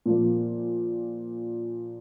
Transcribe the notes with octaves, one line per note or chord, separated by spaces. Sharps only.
A#2 F3 A#3